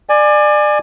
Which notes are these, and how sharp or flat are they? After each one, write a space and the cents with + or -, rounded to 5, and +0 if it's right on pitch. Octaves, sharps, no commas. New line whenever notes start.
D5 +25 G#5 +0